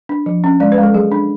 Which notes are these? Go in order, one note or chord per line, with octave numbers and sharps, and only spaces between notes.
D4
F3
C#4
G#3 D5
B4
G#3
A4
F#3 G#4
D4